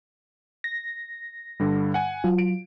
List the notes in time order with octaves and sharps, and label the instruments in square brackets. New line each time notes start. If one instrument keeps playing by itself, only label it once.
[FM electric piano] A#6
[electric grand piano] G2 D3 G3
F#5 G#5
[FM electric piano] F#3 F4
[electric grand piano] D7